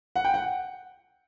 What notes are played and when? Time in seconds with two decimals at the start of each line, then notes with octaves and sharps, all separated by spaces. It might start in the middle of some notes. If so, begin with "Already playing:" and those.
0.16 F#5
0.25 G5
0.34 F#5